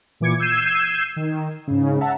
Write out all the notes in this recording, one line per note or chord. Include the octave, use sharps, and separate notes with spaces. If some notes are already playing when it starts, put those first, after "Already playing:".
A#2 E3 D6 G#6 C#7
E6 G6 G#6 C7 D#7 E7
D#3
G#2 C#3
E5 F#5 A5 A#5